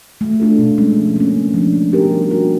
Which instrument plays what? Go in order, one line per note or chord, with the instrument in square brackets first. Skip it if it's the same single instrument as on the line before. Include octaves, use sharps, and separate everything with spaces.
[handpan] A3
D4 F4 A4
B2
G#3 C#4
F3
A#3 C#4
C#3
F3 A3 D4
G#3
B3 D#4 G4 A#4
G3
A#3 D4 F#4 A#4